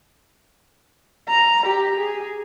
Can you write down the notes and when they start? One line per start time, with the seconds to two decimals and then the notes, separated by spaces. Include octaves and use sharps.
1.28 A#5
1.66 G4
1.96 G#4